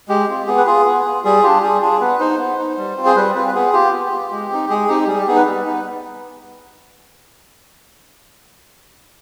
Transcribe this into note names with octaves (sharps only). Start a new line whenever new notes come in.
G#3 G4
C4 F4
B3 G#4
B4
F4 G#4
B3
F4
G3 G#4
D4 F4 G4
G3 G#4
D4 F4 G#4
B3 B4
D#4 C5
B3
D#4
G3
C4 F4
G#4
G3 B4
C4 F4 B4
B4
B3 G#4
F4 G4
B3
F4
G#3
C4 D#4
G#3 G#4
C4 D#4 G4
G4
G3 G#4
G4
B3 D#4 G#4
B4
G3
B3 D#4